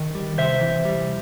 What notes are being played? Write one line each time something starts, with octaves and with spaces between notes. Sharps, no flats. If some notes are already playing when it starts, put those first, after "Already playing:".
Already playing: D#3 D#5
G3
C3 C5 E5
E3
G3